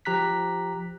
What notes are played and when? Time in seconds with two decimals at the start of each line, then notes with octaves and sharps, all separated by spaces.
0.05 F3 G4 A#5 F#6 B6